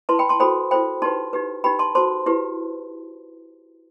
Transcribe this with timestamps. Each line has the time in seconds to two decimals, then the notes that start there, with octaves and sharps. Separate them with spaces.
0.09 E4 B4 A5 C6
0.19 G5 B5
0.29 A5 C6
0.40 F#4 A4 C5 G5 B5
0.71 E4 A4 C5 G5 B5
1.02 D#4 G4 B4 A5 C6
1.33 D#4 G4 B4
1.64 D#4 G4 B4 G5 B5
1.79 A5 C6
1.95 F#4 A4 C5 A5 C6
2.26 E4 G4 B4